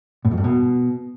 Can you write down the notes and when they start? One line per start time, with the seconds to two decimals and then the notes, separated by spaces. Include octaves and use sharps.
0.25 A2
0.31 F2
0.38 G2
0.44 B2